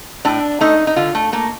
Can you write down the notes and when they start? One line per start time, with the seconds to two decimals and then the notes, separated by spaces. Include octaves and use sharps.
0.25 A2 D4
0.61 A3 D#4
0.87 D#4
0.96 D3 F4
1.15 A3
1.33 A3 A#3